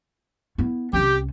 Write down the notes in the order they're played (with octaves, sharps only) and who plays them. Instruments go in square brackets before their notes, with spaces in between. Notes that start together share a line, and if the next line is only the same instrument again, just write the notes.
[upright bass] B3 E4
[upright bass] C2 C#4 [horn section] G4